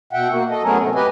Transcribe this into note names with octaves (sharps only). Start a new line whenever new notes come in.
B2 E5 F#5 G5
A#3 F#4
A4 D#5
F#3 A3 B3 C#4 G#4 A#4
A2 C3 A3
G4 B4 D#5 G#5